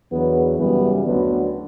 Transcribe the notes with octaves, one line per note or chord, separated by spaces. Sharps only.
E2 D3 F#3 B3
F#2 C#3 E3 G3 B3
D2 D3 F#3 B3